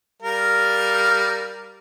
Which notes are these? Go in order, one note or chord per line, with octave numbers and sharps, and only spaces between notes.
G3 A#4 F5